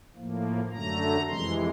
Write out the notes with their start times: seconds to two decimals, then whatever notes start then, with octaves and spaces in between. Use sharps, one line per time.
0.15 A2 F3 A#3
0.71 F#2 D3 F#3 A3 A#5
1.28 F2 C3 E3 G#3 C6